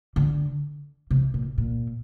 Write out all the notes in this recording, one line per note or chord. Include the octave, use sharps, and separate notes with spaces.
D3
C3
A#2
A#2